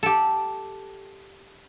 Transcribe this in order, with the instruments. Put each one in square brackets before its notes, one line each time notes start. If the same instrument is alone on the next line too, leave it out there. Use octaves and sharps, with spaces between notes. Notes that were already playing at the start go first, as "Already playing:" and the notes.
[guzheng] G4 A4